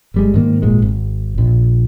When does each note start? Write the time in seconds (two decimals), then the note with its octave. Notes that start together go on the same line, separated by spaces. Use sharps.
0.14 G1 G3 G#3
0.34 G#2 D#3 A#3
0.62 D#1 G#1 A#2 G#3
0.82 G#1
1.38 A#1